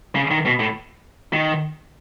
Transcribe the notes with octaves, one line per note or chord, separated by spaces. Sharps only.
C#3
D#3
B2
A2
D#3